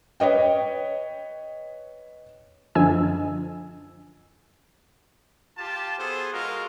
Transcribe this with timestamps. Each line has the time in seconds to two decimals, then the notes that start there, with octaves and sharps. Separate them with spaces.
0.20 B4 C#5 D#5 G5
2.75 F#2 D3 F3 D#5 G#5 E6
5.58 F4 G4 A5
5.98 B3 G#4 A4 C5
6.32 G#3 F4 F#4 A#4